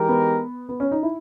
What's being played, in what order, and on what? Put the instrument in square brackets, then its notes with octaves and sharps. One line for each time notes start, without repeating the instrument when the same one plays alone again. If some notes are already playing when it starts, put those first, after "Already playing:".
Already playing: [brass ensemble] E3 G#3 D#4 G4 A#4
[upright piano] B3
B3
C#4
D#4
E4